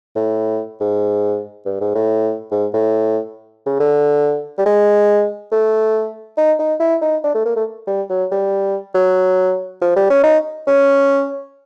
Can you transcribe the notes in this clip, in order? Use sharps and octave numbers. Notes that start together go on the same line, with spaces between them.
A2
G#2
G2
G#2
A2
G#2
A2
C#3
D3
G3
G#3
A3
D#4
D#4
E4
D#4
D4
A3
A#3
A3
G3
F#3
G3
F#3
F3
G3
C#4
D#4
C#4